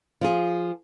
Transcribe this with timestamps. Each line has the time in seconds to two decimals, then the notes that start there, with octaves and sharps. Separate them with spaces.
0.21 F3 F4 G#4